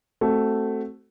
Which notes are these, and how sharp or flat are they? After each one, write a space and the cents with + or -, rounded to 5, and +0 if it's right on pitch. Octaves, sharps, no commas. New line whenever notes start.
A3 +0 C4 +0 F#4 +20